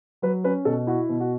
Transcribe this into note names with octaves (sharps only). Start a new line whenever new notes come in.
F#3 B4
C#4 B4
B2 A4
E4 F#4
B2
F#4